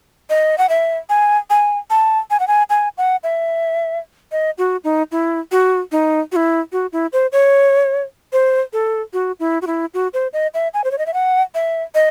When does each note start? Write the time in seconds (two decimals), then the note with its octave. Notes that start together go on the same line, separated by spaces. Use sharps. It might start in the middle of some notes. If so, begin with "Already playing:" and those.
0.30 D#5
0.58 F#5
0.69 E5
1.09 G#5
1.50 G#5
1.90 A5
2.31 G#5
2.40 F#5
2.48 G#5
2.70 G#5
2.98 F#5
3.24 E5
4.32 D#5
4.58 F#4
4.84 D#4
5.12 E4
5.52 F#4
5.92 D#4
6.32 F#4
6.36 E4
6.72 F#4
6.93 E4
7.13 C5
7.32 C#5
8.33 C5
8.73 A4
9.13 F#4
9.40 E4
9.62 F#4
9.67 E4
9.94 F#4
10.14 C5
10.33 D#5
10.54 E5
10.74 G#5
10.84 C5
10.91 C#5
10.98 D#5
11.06 E5
11.14 F#5
11.55 E5
11.95 D#5